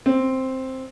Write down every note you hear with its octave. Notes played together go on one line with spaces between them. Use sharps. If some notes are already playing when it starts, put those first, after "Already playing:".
C4